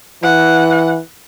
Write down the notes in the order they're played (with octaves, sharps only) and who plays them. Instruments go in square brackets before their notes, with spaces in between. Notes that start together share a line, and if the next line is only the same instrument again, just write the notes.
[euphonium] E3 [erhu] F#5